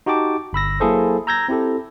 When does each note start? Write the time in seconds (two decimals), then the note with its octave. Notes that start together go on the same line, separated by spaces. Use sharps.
0.06 D#4 F#4 G4 G5 A5 D6
0.53 G1 B5 E6 A#6
0.80 F#3 A#3 E4 G#4 A4 C5
1.27 A#5 E6 G6 G#6 A#6
1.48 C4 E4 G4 A4